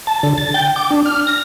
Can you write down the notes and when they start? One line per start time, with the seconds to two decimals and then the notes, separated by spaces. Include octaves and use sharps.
0.07 A5
0.23 D3
0.38 A6
0.54 G5
0.76 D6
0.91 D4
1.06 F6
1.27 A#6